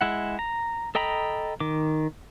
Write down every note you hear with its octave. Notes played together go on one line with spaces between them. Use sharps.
G#3 E4 F#5
A#5
A4 D#5 G5 A#5 B5
D#3 D6